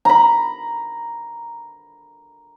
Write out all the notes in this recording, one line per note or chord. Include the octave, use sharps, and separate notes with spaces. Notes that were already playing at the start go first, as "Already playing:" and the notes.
A#5 B5